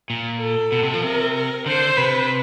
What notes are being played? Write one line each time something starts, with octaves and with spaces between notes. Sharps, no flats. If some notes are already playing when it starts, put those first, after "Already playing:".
A#2
A4
B2
C3
F3
C3 A#4
A#4
D3 C5
C3 B4